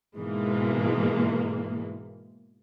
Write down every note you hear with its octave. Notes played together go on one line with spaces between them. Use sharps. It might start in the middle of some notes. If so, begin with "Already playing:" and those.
G#2 B2 E3 G#3 A#3